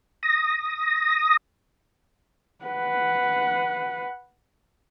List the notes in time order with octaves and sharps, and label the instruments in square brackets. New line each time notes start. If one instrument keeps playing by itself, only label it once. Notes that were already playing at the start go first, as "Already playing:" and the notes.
[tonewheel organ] D#6 A#6
[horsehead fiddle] B4 F#5